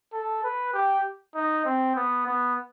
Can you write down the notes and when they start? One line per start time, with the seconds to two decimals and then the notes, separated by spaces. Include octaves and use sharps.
0.13 A4
0.44 B4
0.74 G4
1.35 D#4
1.66 C4
1.96 B3
2.27 B3